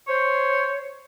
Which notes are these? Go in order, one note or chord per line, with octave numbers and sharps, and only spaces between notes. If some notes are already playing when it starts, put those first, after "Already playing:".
C5 C#5